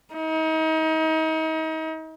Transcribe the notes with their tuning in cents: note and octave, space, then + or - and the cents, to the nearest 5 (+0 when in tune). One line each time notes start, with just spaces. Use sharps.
D#4 +35